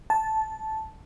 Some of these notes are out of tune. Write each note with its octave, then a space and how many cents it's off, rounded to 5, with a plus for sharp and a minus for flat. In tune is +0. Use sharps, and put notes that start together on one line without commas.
A5 -10